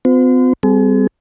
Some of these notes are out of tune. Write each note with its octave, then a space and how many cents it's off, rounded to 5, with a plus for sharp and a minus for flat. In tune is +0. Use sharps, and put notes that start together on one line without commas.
C4 -45 F4 +45 C5 -40
G3 +0 C4 -35 G#4 +40